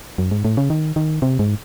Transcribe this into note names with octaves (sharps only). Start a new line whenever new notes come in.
F#2
G#2
A2
C#3
D#3
D#3
C3
G#2